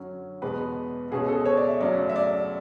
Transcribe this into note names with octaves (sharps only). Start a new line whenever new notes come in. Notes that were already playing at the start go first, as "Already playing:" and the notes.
Already playing: F#2 D3 F#3 C#4
E2 B2 G#3 B3 B4
C#2 B2 G#3 C#4 G#4
A4
C#5
D5
E5
F#2 C#3 F#3 A3 D5
E5
D5